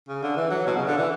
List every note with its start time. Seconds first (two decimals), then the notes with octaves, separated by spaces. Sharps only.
0.09 C#3
0.23 D3
0.36 E3
0.50 F#3
0.67 B2
0.77 C#3
0.87 D3
0.98 E3